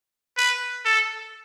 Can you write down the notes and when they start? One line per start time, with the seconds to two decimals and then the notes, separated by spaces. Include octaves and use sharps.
0.37 B4
0.85 A4